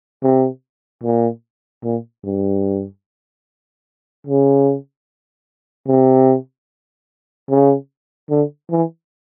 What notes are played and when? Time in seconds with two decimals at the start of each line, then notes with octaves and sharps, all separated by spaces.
0.23 C3
1.03 A#2
1.84 A#2
2.24 G2
4.27 C#3
5.87 C3
7.50 C#3
8.30 D3
8.71 E3